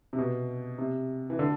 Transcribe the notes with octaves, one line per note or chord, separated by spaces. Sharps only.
C3
B2
C3
E3
D3